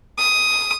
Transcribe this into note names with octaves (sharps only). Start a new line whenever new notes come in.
D#6